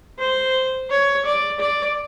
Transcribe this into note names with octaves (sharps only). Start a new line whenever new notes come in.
C5
C#5
D5
D5